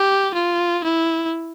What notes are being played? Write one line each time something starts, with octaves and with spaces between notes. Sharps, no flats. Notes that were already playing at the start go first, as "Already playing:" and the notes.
Already playing: G4
F4
E4